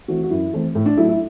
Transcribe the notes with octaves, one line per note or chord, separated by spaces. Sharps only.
E3 A3 C4 F#4
F#4
F#2 E4
E3 A3 C4
A2
D4
F#3 A3 E4
E4